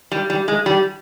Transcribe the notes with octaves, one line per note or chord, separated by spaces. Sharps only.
G3
G3
G#3
G3